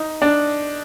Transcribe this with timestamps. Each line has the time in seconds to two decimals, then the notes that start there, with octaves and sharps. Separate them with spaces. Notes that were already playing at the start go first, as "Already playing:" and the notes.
Already playing: D#4
0.22 D4